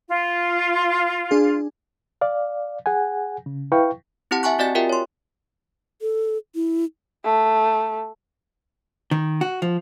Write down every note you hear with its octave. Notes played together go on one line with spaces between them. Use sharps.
F4
D4 G#4
D5 F5
G#4 F#5 G#5
C#3
E4 B4 F5 G5 C#6
C4 E4 G4 F#5 A5
E5 F#5 G#5 A5 C#6 F#6
C4 F#4 D5 D#5 G#5 A6
F4 G4 A#4 E5 G5
C#5 C6
A4
E4
A3
D#3
F#4
F3